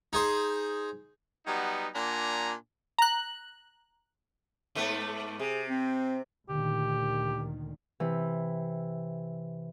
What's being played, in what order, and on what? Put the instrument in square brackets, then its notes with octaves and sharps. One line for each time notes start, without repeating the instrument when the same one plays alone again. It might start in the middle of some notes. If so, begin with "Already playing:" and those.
[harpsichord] D#4 G#4 C5
[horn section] F#3 G3 B3 D#4 F#5
A#2 D4 F#5 G#5 A#5
[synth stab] A#5 F#6
[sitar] G#2 A3 B3
[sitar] C3 [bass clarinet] G#4
[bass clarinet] C4
[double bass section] D2 A#2 D#3 [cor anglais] G4
[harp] C3 E3